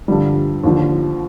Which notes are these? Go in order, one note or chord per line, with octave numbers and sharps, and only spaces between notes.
G2 D3 F3 G3
D#2 D3 F3